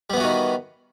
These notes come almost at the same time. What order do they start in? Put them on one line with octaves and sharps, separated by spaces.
G3 B3 E3 F#4 D#3